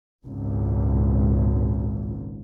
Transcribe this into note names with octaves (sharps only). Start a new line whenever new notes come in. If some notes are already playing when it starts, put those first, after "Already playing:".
G#1 C#2 A#2